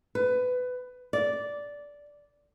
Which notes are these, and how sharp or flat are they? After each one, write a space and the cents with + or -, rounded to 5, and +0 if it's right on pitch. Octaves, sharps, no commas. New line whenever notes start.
B4 +20
D5 -10